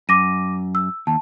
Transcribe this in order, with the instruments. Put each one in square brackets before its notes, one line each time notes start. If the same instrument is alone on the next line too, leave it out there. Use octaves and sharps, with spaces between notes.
[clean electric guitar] F#2 [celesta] D6 A#6 D#7
[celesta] E6
[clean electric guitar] D#2 [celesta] A5